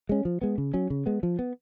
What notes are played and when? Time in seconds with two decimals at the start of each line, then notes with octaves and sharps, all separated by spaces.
0.09 G#3 C#4
0.25 F3
0.41 G#3 B3
0.58 C#3
0.74 F#3 C#4
0.90 C#3
1.06 G#3 B3
1.23 F3
1.39 B3